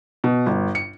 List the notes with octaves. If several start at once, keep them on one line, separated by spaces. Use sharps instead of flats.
B2
G1
C#7